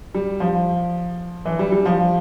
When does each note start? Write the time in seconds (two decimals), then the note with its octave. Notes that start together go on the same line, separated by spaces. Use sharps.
0.14 G3
0.40 F3
1.45 E3
1.59 G3
1.72 G3
1.86 F3